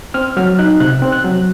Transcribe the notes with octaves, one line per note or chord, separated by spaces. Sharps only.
C4 F6
F#3 F6
D#4 F#6
C3 F#6
C4
F#6
F#3